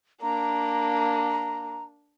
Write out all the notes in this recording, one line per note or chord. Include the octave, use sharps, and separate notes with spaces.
A#3 D4 A#5